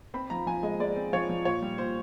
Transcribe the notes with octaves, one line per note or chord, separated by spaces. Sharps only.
C4 B5
F3 A#5
F3 G#5
G#3 D#5
G#3 D5
C4
F3 C#5
F3
A#2 C#5
G3
A#2 C5